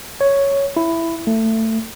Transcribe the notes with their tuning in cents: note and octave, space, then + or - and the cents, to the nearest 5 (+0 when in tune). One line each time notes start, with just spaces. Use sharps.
C#5 +0
E4 +10
A3 +20